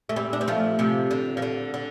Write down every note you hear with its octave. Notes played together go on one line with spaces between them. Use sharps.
A3
G3 C4
D4
C4
F3 A3
C3 F3
D3
F3
D3
D3